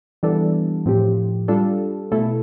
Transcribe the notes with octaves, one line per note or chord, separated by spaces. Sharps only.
E3 G3 B3 D4 A4
A2 F3 C4 G4
G3 D4 F4 A4
B2 A3 E4 A4